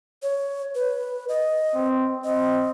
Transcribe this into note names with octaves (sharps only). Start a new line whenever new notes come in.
C#5
B4
D#5
C4
C4 D#5